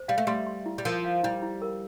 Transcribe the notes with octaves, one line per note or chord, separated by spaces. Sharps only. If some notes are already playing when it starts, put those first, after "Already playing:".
Already playing: C5
G3 F5
A3
G3 C6
C6
E4
G3
F3 A#4
F5
G3 E4
E4
A#4